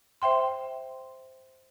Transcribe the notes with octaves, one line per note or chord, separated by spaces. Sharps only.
C5 E5 G5 C6